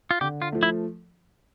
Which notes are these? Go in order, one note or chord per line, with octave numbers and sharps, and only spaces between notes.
F4
D3 G4
F4
F3 A3
E4